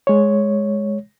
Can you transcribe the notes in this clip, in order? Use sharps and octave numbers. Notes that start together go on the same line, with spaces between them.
G#3 C#5